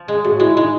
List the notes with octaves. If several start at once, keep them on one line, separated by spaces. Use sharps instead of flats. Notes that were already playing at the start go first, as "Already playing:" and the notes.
Already playing: F3
G#3 G#4
A2 F#4
G#3 E4
G#3 D#4